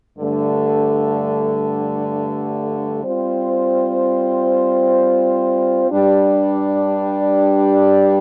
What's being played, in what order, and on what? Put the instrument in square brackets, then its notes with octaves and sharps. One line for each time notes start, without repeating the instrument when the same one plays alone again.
[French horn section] G2 D3 A3
G3 C4 F4 C5
G2 G3 D4